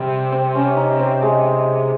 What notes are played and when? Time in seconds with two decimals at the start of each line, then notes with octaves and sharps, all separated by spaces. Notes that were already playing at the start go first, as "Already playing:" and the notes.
Already playing: C3 G3
0.32 C4
0.55 C#4
0.77 D#4
0.99 C4
1.22 G#3